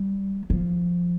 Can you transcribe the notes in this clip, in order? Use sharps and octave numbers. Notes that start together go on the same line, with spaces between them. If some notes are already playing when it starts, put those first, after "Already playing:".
Already playing: G3
F3